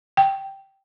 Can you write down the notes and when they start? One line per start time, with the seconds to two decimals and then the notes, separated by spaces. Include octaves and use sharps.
0.17 G5